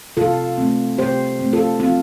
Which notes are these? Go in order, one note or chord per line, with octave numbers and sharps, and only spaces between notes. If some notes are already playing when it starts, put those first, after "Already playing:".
C3 F4 A4
A3 C4
C3 G4 C5
A3 C4
F4 A4
F3 C4 F4